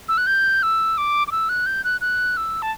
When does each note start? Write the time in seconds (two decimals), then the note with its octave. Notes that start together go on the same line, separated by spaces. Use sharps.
0.09 E6
0.18 F#6
0.27 G6
0.63 E6
0.98 D6
1.28 D6
1.32 E6
1.49 F#6
1.66 G6
1.84 F#6
2.01 F#6
2.37 E6
2.62 A5